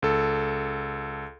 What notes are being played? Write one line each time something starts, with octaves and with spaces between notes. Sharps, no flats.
C#2 A4